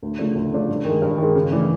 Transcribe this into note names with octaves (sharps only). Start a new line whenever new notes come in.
D2
C#3 F3 A3 D4
D2
C#3 F3 A3 D4
G2
D#3 G#3
G2
D#3 G#3
C#3
E3 A3 D4